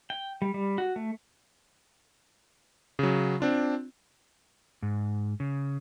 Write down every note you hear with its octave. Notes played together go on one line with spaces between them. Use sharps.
G5
G3
G3
F#4
A3
C#3 F#3
C4 D4 F4
G#2
C#3